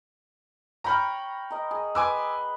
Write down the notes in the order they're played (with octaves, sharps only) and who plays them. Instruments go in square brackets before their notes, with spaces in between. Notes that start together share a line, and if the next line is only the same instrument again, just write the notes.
[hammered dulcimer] C#5 G5 C#6 [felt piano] A#5 B5 F6
[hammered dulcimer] A#4 D#5
G#4
[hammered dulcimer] B4 C6 [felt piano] G#5 D6 E6